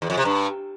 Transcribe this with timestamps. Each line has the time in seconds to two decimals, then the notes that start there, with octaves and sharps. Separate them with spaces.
0.02 E2
0.10 F2
0.18 C3
0.25 G2